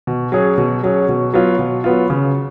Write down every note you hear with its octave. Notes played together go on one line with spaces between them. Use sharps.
B2
F#3 C#4 G#4
B2
F#3 C#4 G#4
B2
F#3 B3 F4
B2
F#3 B3 F4
C#3